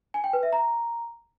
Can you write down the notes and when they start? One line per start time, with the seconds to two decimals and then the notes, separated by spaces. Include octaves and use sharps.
0.14 G#5
0.24 G5
0.33 B4
0.43 E5
0.53 A#5